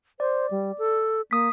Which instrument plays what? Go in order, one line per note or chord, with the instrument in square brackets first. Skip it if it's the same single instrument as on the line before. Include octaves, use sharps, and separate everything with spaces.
[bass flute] C5 [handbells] D5
[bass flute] G3
A4
[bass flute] A#3 [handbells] D#6 B6